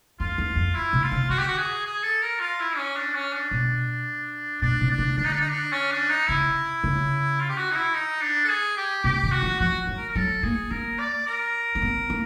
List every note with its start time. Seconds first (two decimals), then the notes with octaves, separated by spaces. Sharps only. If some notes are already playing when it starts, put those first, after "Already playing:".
0.19 F2 F4
0.38 E2
0.56 F2
0.75 E4
0.93 C3
1.02 F4
1.12 C#3
1.29 D3 F#4
1.39 G4
1.48 F#4
1.58 G#4
1.86 G#4
2.03 A4
2.22 A#4
2.40 F4
2.60 E4
2.78 C#4
2.96 D4
3.15 C#4
3.33 D4
3.51 B2
4.62 B2 D4
4.81 C3
4.90 D4
4.98 C#3
5.17 D3 D4
5.25 D#4
5.32 D4
5.41 D#4
5.48 D4
5.73 C#4
5.91 D4
6.10 D#4
6.28 C#3 E4
6.84 C#3
7.39 F4
7.49 G4
7.57 F#4
7.71 D#4
7.75 E4
7.94 D#4
8.21 D4
8.44 A4
8.49 G#4
8.77 G4
9.04 C3 G4
9.23 D#3
9.32 F#4
9.42 F3
9.60 F3 F#4
9.87 F#3
9.97 A#4
10.09 A#4
10.15 F#3 A4
10.43 A#3 G#4
10.71 A#3 A#4
10.98 D5
11.26 A#4
11.75 C4
11.82 B3
12.10 A#3